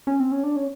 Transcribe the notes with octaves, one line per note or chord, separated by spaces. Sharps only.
C#4
C4
C#4
D4
C#4